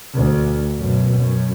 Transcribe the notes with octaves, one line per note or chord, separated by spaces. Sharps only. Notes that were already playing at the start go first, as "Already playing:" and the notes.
D2
F#2 B2
F#2